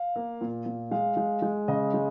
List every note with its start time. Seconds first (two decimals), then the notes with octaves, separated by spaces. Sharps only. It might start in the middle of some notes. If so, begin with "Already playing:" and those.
Already playing: F5
0.16 A#3
0.41 A#2
0.66 A#2
0.91 G#3 F5
1.17 G#3
1.42 G#3
1.68 C#3 D#5
1.94 G#3